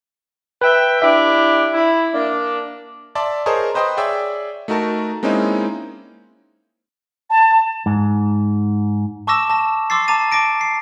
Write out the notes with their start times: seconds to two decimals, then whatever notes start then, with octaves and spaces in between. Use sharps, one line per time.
0.61 B4 E5 G5
1.02 D4 E4 G4 E5
1.73 E4
2.13 A#3 D4
3.15 D5 E5 A5 C6 D6
3.46 G#4 A#4 C5 C#5 D#5 A5
3.74 B4 C5 D#5 G5 C6 D#6
3.97 G#4 C#5 D5 E5 G5 E6
4.68 A3 D#4 F#4 A#4 A5
5.23 G#3 A#3 C4 C#4 D#4 E4
7.30 A5
7.86 G#2
9.27 A5 C#6 D6 E6 A#6 E7
9.50 A5 A#6
9.90 C6 D6 E6 A6 C7
10.08 A5 A#5 D6 A6 D#7
10.32 A5 D6 A6 A#6 D7
10.61 C7